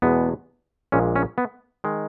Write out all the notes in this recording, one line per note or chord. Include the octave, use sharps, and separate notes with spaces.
E2 B2 G#3 B3
A#1 A#2 G#3 C#4
C#4
B3
D#3 G#3